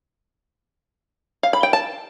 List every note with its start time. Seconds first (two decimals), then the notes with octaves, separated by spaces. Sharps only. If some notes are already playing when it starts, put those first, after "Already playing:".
1.43 F5
1.53 B5
1.63 G5
1.73 A5